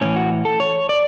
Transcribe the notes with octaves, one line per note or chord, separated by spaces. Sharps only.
A2 E3 C#4
F#4
A4
C#5
D5